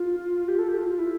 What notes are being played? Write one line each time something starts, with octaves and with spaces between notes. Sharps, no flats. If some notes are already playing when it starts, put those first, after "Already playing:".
Already playing: F4
G4
A4
G4
F4
F4
E4